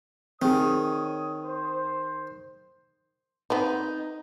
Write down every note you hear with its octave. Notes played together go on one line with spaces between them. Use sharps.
D#3 C4 G#4 C#5 D#6
C5
B3 C4 D#4